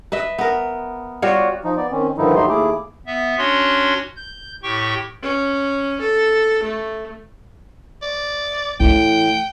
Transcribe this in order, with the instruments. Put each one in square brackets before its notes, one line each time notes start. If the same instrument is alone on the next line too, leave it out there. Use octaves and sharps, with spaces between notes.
[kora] B4 D#5 E5
B3 A#4
G3 F4 F#4 C#5
[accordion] F3 D#4
B3 D5
D#3 C4 C#4
G2 D3 D#3 F3 D#4 E4
D2 F#3 A3 D#4 G4 C6
D#2 A3 E4 G#4 D6
[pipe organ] B3 E5
C#4 D4 F#4 C#5 C6
G6
A2 G4 G5 C#6
[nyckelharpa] C#4
A4
A3
[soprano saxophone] D5
[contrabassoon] A2 [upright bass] E3 A3 [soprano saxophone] G5